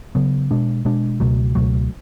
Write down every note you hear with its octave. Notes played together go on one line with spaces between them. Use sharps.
C#3 F#3 B3
B2 G#3 D4
B2 G#3 D4
C#2 B2 F#3 A3
C#2 B2 F#3 A3